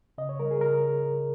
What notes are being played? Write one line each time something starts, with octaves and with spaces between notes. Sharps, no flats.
C#3 D#5
C#5
G3 A#4
G#4
C#3 A#4